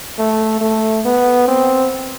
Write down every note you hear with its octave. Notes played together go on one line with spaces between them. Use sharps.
A3
A3
B3
C4